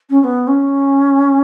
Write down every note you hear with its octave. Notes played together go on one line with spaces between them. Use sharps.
C#4
C#4
B3
C#4